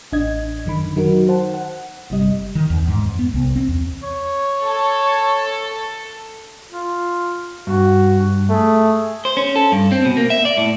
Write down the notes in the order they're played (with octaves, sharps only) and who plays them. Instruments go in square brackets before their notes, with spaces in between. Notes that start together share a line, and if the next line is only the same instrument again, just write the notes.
[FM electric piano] A1 D4 D#5 G#6
F#2 D3 D#3 B5
D#3 F#3 D#4 F#4 A#4
C5 F#5 A5
F#5
G1 C3 G3 D#5
[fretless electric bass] D#3
E2
G#2
F2
B3
C2
C4
E2
[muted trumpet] C#5
[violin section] A4
[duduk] F4
[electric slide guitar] G2 [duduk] F#4
[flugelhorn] A3 [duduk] G#4
[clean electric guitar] C5
C#4
A4
G2
C4
B2
A#3
E5
D5
A2